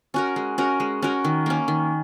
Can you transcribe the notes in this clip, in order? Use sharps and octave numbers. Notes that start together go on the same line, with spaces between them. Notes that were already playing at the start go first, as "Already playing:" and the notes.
C#4 F#4 A#4
G#3
C#4 F#4 A#4
G#3
C#4 F#4 A#4
D#3
A#3 C#4
D#3